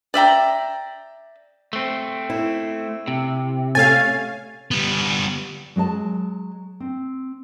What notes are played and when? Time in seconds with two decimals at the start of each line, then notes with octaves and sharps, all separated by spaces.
0.14 D5 E5 G5 A#5
1.73 A3 C4
2.30 E4
3.08 C3
3.75 A3 C#4 D5 F5 G#5 A6
4.71 G3 B3
5.76 F#3 G#3 F5 A5
6.80 C4